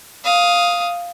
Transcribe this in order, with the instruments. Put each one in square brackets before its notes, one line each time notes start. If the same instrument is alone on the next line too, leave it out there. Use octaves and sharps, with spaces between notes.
[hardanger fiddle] F5 D#6